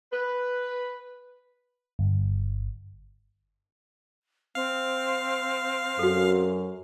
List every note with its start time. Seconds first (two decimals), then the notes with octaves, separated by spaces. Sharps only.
0.12 B4
1.99 G1
4.55 C4 F5
5.99 F#2 F#4 A4